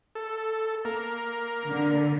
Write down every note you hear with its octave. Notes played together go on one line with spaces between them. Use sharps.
A4
A#3 A#4
D3